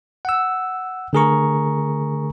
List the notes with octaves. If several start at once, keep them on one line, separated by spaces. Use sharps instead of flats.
F#5 E6
D3 A3 G#4 A#4 A#5 C#6